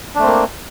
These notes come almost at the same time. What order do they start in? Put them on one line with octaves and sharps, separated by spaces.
D4 A3 C4 A#3